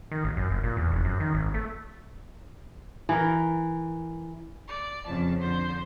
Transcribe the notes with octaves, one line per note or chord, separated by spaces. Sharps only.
D#3
A1
F#2
F#1
A#2
E2
F1
F#2
D#3
G#1
A3
E3 A#4
D5
F2 C#3 A5
D3 C5